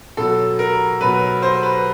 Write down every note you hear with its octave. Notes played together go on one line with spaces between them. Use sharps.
B2 F#3 A4
A#4
B2 F#3 B4
C5
B4